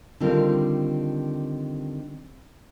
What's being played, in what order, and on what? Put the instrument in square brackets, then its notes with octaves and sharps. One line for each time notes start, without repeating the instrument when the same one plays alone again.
[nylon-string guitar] D3 D#3 G3 C4 F4 A#4